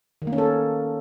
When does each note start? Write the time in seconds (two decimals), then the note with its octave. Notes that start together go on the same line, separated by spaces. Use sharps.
0.22 D#3
0.27 A#3
0.33 C#4
0.38 A4